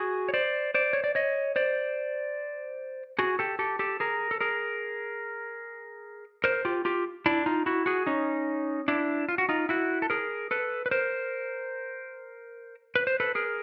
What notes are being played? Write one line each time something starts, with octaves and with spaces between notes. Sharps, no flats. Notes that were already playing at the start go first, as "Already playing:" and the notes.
Already playing: F#4 G#4
C#5
C5 D5
C5 D5
C#5
D5
C#5 D#5
C5 D5
F#4 G#4
G4 A4
G4 A4
G4 A4
G#4 A#4
A4
G#4 A#4
A#4 C5
F4 G4
F4 G4
D4 E4
D#4 F4
E4 F#4
F#4 G#4
C#4 D#4
D4 E4
F4
F#4
D#4 F4
E4 F#4
A4
G#4 A#4
A4 B4
B4
A#4 C5
B4
C5
A4 B4
G#4 A#4